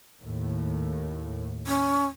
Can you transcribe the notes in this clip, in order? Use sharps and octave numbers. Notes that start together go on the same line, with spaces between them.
D#2 A2
C#4